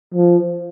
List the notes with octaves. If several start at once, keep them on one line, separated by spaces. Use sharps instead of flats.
F3